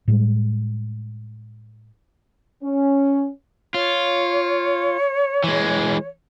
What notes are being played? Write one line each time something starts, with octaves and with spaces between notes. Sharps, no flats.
A2 G3 G#3
C#4
F4 C#5
E3 G#3